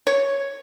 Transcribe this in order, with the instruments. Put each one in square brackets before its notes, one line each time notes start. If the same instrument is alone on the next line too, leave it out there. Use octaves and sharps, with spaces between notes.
[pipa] C#5